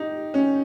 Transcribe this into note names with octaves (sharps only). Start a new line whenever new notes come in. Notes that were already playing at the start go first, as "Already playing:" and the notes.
Already playing: D#4 G4
C#4